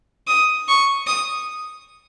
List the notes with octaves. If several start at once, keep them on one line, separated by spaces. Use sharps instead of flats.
D#6
C#6
D#6